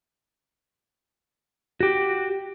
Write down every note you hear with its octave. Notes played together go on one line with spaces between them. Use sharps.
F#4 G4